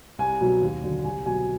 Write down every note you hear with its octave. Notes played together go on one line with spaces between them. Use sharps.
C2 G#5
B2 F#3
D#2
D3 F#3
C2 G#5
B2 F#3 G#5